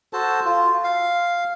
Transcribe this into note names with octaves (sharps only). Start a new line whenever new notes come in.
F#4 A4 C5 A5
F4
F5